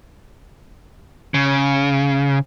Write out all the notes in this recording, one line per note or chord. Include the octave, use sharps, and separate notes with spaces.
C#3